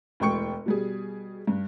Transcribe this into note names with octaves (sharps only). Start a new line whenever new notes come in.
E1 D2 G#3 G5 C#6 C#7
B2 G3 G#4
G2